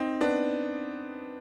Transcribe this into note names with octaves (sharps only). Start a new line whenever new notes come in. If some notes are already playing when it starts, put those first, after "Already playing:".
Already playing: C4 D#4
B3 D4